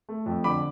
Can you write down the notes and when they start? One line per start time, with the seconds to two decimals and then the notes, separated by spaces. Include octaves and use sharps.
0.09 A3
0.26 F2
0.44 D3 B5 D6